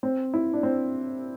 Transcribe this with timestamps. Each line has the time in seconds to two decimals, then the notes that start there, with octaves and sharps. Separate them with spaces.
0.03 C4
0.34 E4
0.53 D4
0.63 C4